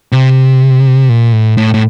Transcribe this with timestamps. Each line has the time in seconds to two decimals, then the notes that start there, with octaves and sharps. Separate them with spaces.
0.12 C3
1.09 A#2
1.32 A2
1.57 A2
1.74 A2